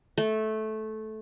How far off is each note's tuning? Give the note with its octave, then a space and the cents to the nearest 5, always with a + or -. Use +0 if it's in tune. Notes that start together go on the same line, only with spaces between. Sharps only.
A3 -15